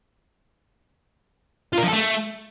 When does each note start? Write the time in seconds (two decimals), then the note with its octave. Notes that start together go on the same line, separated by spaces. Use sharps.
1.73 F4
1.78 A#4
1.83 F3
1.88 A4
1.93 A3